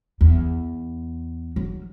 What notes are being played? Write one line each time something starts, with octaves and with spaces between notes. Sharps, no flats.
E2
F#3